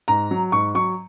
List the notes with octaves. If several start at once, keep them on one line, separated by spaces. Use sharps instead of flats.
G#2 A#5
F#3
G#2 C#6
F#3 C#6